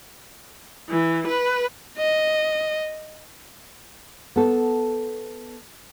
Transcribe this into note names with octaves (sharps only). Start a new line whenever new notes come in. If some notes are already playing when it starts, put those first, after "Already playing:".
E3
B4
D#5
B3 A4